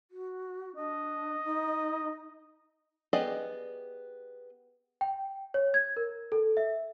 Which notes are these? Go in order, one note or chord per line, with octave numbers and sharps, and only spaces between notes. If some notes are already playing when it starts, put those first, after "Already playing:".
F#4
D4 D#5
D#4
B3 G4 G#4 D5 D#5
G5
C#5
G#6
A#4
A4
E5